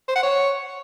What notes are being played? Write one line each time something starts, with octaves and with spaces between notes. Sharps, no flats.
C5
F#5
C#5